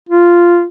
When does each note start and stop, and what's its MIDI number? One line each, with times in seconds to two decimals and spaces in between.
0.09 0.65 65